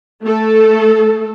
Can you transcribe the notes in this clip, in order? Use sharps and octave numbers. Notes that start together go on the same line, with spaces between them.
A3 A4